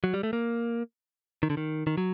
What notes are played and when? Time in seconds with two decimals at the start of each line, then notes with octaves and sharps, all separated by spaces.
0.04 F#3
0.14 G3
0.23 A3
0.33 A#3
1.43 D#3
1.50 D3
1.57 D#3
1.87 D#3
1.97 F#3